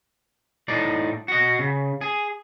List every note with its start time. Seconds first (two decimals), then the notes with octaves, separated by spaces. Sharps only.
0.68 A2 D#4 D5
1.28 F#4 D#5
1.59 C#3
2.01 G#4